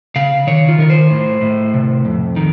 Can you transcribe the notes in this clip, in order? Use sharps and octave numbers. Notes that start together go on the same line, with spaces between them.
C#3 F5
D#3 C#5
F4
D#3 A#4
C5
A2
A2
C3
F2
D#3